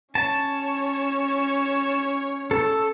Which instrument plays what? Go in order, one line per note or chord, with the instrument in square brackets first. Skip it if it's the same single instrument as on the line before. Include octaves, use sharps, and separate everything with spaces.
[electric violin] C#4 C#5 [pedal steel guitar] A5
[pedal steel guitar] A4